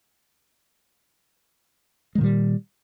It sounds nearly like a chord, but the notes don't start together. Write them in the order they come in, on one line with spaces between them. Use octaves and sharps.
G#3 D#3 A#2 G3